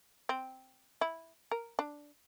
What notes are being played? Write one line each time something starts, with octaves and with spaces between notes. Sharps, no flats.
C4
E4
A#4
D4